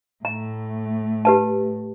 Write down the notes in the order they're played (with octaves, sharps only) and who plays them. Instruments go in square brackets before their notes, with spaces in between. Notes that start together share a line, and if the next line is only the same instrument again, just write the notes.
[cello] A2 A3 [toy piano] A#5
[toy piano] G4 B4 A5